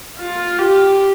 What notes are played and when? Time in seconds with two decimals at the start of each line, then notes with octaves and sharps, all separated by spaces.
0.20 F4
0.59 G4